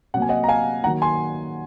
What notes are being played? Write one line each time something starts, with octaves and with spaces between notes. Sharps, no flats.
C3 F#3 A#3 F#5
G#5
D#5 F#5
A#5
F5 G#5
D#3 F#3 A#3 F#5 A#5
G#5 C6